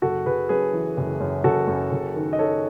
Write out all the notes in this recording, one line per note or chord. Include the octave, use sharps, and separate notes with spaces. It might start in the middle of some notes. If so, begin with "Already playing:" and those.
F#1 F#4 A4
F#1 G#4 B4
F#2 G#4 B4
E3
F#1
F#2
F#1 F#4 A4
F#2
F#1
D#3
D#5
D#3 A4 C#5